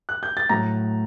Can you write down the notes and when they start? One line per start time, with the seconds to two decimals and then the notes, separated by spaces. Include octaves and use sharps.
0.09 F#6
0.23 G6
0.37 A6
0.49 A2 F#3 A#5 A#6